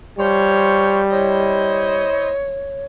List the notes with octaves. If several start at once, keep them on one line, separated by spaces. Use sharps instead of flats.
F3 G3 C5 C#5
E4 C5 C#5 D#5